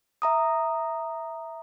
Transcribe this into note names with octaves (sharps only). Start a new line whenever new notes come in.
E5 A#5 D#6